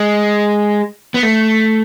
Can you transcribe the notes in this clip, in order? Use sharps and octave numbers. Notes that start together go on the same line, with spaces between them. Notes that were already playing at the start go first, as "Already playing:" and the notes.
Already playing: G#3
B3
A3